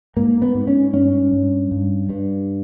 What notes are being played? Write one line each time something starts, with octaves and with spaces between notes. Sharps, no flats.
G#2 A#3
B3
G#2
C#4
G2 C#4
G2
G2
G2